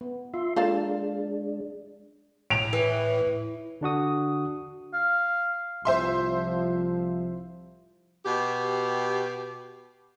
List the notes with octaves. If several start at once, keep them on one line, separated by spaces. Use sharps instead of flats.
B3
F4 E5 C6
G#3 A#3 D4 F4 A4 F5 A5
A2 D7 F7
E3
D3 D4 F#4 D#6
F5
C2 F3 C5 E5 C6
B2 G4